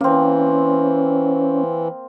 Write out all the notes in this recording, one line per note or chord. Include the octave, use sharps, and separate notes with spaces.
E3 A#3 C4 C#4